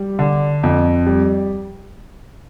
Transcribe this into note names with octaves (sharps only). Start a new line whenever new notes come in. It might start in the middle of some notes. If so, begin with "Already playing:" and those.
Already playing: G3
D3
F2
G3